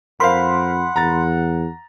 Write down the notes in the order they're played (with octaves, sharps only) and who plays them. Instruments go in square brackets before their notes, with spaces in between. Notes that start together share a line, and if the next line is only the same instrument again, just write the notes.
[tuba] F2 [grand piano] A#4 C5 F5 [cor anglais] F#5 [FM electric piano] B5 C6
[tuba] E2 [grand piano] A#5 A6